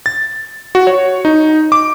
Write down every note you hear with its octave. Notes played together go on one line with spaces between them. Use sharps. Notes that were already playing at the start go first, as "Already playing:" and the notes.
A6
F#4
C#5
D#4
D6